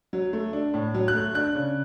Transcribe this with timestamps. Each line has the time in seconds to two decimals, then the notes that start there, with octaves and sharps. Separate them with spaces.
0.13 F#3
0.33 A3
0.53 D4
0.74 A2
0.94 F#3
1.08 F#6
1.14 A3
1.34 D4 F#6
1.55 C#3